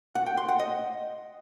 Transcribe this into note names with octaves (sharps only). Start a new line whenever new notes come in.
F#5
G5
C6
F#5
D#5